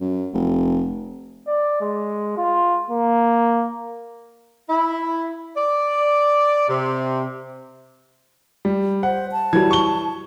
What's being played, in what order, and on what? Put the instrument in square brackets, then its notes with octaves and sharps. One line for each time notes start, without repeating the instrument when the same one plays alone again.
[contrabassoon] F#2
F1
[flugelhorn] D5
G#3
F4
A#3
[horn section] E4
D5
C3
[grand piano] G3
[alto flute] C5 [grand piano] F#5
[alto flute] A5
[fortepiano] E3 F#3 G3 [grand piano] G#6
[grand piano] C#6 G7